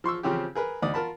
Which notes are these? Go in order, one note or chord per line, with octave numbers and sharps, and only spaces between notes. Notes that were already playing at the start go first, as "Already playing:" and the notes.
F3 C6 C#6 E6
C#3 F3 C4 C#4 G4
G#4 A#4 B4
D2 D#4 D5 D#6
F4 A#4 A5 B5